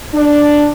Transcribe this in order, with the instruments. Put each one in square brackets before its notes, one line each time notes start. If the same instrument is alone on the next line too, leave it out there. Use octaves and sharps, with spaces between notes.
[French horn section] D4